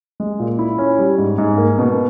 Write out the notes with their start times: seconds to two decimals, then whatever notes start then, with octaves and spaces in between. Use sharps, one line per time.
0.20 G#3
0.40 A#2
0.59 E4
0.78 C#4
0.98 G3
1.18 G#2
1.38 G#2
1.58 A#3
1.79 B2